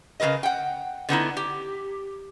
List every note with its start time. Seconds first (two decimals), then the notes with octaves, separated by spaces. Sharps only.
0.20 C#3 G3 A#4 B4 D#5
0.43 F#5 G5
1.09 D3 B3 D#4 E4
1.37 G4